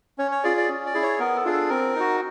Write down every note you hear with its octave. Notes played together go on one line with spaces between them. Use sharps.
C#4 C#5
C#5
F4 G#4 D5
D5
C#4
D5
E4 G#4
C#5
B3 A#4
A4
D4 F4 G#4
A4
C4 A#4
D#4 F#4